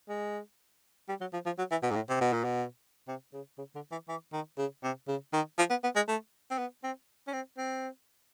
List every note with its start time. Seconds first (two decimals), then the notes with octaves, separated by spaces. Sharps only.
0.09 G#3
1.09 G3
1.21 F#3
1.33 F3
1.46 F3
1.58 F#3
1.71 E3
1.83 B2
1.91 G#2
1.95 A2
2.09 C3
2.21 B2
2.33 A#2
2.44 B2
3.08 C3
3.33 C#3
3.58 C#3
3.75 D3
3.92 E3
4.08 E3
4.33 D#3
4.58 C#3
4.83 C3
5.08 C#3
5.33 D#3
5.58 F3
5.70 B3
5.84 B3
5.96 G#3
6.08 A3
6.51 C4
6.58 B3
6.83 C4
7.28 C#4
7.33 C4
7.58 C4